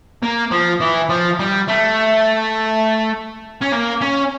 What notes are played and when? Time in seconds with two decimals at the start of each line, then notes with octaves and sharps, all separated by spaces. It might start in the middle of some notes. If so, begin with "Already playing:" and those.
0.22 A#3
0.51 F3
0.80 E3
1.09 F3
1.39 G3
1.68 A3
3.62 C#4
3.73 A#3
4.02 C#4